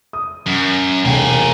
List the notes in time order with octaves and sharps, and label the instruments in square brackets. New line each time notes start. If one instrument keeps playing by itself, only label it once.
[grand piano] D#6
[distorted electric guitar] F#2
[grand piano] E1 B1 G5 [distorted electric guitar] A#3 G#5